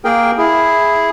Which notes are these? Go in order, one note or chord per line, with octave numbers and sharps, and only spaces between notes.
A#3 G#4 A#4 G5
E4 G#4